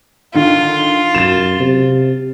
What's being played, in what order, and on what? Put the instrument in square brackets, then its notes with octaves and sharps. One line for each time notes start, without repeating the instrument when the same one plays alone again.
[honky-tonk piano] D3 D#3 [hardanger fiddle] F4
[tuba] F#2 [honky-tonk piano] A6 E7
[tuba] C3